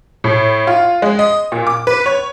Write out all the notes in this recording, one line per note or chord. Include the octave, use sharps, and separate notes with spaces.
A2
F4
G#3
D#5
A#2
D6
B4
C#5